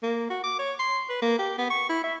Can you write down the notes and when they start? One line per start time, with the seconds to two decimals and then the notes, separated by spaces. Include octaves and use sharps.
0.03 A#3
0.30 F#4
0.44 D6
0.59 C#5
0.79 C6
1.09 B4
1.22 A#3
1.39 G4
1.58 B3
1.70 C#6
1.89 E4
2.04 E5